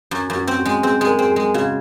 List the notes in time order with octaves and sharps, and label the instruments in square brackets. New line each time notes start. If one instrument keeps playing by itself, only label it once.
[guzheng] F#2
F#2
[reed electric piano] F#4
[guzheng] C4
[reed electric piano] F#4
[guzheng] G#3
[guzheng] C4 [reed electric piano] G#4
[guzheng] G#3 [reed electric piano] G#4
[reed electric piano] A#4
[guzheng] C4
[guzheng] G#3 [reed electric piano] G#4
[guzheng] C#3 [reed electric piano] F#4